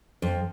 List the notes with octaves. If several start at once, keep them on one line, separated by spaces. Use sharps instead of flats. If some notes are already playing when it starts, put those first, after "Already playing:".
F2